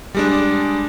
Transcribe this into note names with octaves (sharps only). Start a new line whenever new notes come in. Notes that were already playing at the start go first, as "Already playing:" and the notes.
G3 G#3 D4